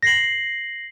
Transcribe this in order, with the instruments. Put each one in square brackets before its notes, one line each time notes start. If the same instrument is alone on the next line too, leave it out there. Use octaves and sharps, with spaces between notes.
[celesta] A#6 C7 F#7